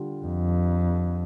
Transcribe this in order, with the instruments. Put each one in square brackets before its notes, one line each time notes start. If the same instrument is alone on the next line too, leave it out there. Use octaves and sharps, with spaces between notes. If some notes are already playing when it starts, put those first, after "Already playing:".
Already playing: [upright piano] D3 G3 F4
[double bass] F2